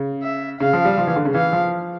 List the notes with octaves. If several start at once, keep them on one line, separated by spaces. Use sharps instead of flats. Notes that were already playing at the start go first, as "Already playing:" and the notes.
Already playing: C#3
E5
C#3 F5
F3
G3
F3
E3
D3
C#3
E3 F5
F3